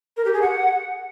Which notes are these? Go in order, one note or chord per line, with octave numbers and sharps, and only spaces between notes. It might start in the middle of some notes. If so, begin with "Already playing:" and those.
A#4
G4
G#4
F#5